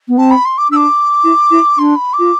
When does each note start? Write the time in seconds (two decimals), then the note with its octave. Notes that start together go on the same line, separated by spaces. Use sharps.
0.08 B3
0.18 C4 A5
0.30 B5
0.45 C6
0.58 D6
0.71 D4 E6
0.76 D6
1.24 E4
1.51 E4
1.78 D4 C6
1.95 B5
2.13 D6
2.19 F4